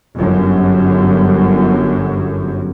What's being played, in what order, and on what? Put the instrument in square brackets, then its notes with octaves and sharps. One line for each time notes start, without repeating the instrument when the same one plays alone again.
[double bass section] G1 F#2